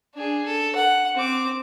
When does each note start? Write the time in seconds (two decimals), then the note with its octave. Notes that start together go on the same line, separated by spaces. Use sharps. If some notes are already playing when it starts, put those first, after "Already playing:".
0.15 D4 G#4
0.46 A4
0.75 F#5
1.15 C4 D6